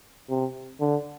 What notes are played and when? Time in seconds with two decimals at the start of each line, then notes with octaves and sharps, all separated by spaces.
0.29 C3
0.81 D3